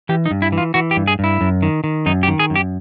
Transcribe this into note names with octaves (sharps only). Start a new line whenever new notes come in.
E3 G4
D#4
G2
E4
E3
F4
E3 F#4
G4
G2
G#4
G2 E4
F#2
D#3
D#3
F#2 D#4
G4
D#3
G#4
F#2
G4